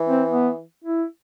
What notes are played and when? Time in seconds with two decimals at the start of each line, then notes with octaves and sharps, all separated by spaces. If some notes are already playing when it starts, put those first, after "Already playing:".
Already playing: E3
0.09 C4
0.30 B3
0.84 E4